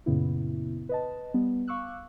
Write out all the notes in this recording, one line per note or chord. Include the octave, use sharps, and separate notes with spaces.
F#2 A#2 C#3 B3 E4
B4 D#5 A5
G3 B3
F5 C#6 D6 E6 F#6